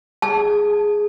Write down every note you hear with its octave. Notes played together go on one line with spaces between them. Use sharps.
G#4 A5